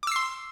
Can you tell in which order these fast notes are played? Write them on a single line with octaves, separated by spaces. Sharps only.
D6 E6 C7 C6